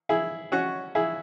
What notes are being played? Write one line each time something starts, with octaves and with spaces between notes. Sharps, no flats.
E4 G#4
C#4 F#4
E4 G#4